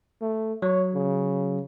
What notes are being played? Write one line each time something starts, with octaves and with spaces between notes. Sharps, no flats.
A3
F#3 C#5
C#3